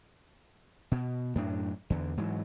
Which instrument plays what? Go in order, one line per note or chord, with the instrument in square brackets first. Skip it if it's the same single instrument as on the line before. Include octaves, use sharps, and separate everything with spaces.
[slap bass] B2
F#2 A2 D4
E2 D3
G#2 E3 F#3